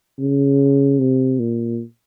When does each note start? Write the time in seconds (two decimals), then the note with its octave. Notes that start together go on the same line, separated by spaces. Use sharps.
0.19 C#3
0.99 C3
1.39 A#2